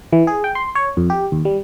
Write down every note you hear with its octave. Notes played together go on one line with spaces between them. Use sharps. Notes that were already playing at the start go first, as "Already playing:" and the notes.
E3
G#4
G5
C6
C#5
F2
G4
D#2
G3